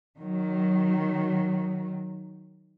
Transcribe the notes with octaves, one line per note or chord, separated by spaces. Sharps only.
D#3 F#3